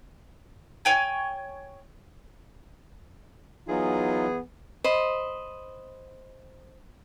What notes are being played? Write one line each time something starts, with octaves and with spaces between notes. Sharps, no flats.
C#5 G5 G#5
E3 F#3 B3 D#4 F4 G#4
C5 D#5 B5